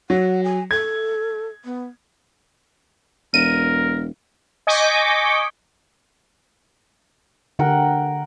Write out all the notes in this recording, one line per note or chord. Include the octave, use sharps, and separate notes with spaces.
F#3 F#5
G#5
A4 G#6
B3
E1 A#4 D#7
D#5 G#5 C#6 D6 G6 B6
D3 A#4 F#5 G5